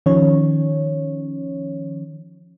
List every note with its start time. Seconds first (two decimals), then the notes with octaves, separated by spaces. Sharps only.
0.06 D#3 F3 C#4 C#5